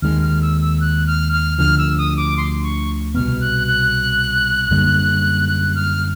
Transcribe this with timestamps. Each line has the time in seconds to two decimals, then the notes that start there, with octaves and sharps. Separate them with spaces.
0.02 D#2 D#3 G#3 F6
0.23 F6
0.42 E6
0.61 E6
0.81 F#6
1.07 F6
1.33 F6
1.58 D2 D3 F3 F6
1.78 E6
1.98 D#6
2.17 D6
2.37 C6
2.63 C#6
3.14 C2 B2 G#3 B3 F6
3.41 F#6
3.67 F#6
4.71 F#2 D3 G3 A#3
5.49 F#6
5.75 F6